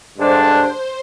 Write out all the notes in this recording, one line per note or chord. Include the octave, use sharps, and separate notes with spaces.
G2 D3 G#3 D4 C5